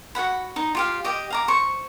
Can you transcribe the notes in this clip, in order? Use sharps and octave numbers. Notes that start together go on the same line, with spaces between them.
F#4 G#4 F#5 B5
D#4
F4 G4 F5
G4 D#5 G5 D6
F5 A#5 D6
C5 C#6